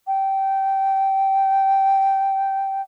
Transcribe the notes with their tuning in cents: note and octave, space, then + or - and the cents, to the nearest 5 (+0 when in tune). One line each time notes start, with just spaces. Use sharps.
G5 -15